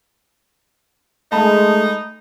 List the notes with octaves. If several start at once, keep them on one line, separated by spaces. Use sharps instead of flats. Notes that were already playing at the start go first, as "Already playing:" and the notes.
G#3 A3 D#4 A5 B5